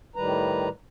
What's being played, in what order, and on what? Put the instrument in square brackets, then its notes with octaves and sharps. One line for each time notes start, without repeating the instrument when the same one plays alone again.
[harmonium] A2 D#3 G3 B4 A#5